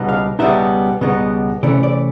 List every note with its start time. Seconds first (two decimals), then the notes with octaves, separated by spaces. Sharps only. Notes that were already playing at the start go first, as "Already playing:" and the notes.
Already playing: C#2 B2 G3 B3 D#4
0.09 F5
0.39 C#2 B2 G3 B3 D#4 E5
1.01 C#2 B2 G3 B3 D#4
1.63 C3 E3 A3 C#4 D5
1.83 D5